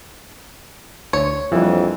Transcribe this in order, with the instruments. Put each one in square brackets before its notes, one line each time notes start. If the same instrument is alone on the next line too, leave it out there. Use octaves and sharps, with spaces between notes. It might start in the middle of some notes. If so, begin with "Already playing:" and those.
[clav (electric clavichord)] D2 [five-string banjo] C#5
[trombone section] A#1 F2 [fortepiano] E3 [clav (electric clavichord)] F3 G3